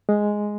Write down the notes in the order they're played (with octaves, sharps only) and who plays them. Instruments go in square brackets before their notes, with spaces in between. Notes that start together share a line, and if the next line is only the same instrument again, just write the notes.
[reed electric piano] G#3